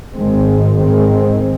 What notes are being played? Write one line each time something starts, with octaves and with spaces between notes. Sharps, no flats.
G#1 G#2 D#3 G#3 C4
G#2 D#3 G#3 C4